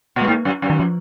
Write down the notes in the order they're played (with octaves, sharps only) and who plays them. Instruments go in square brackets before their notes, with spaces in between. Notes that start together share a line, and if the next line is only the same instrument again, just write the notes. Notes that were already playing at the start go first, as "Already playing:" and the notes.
[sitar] A#2
[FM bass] G#3
[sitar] G#2 [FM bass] A#3
[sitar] F#2
F#2
[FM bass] D#3
F3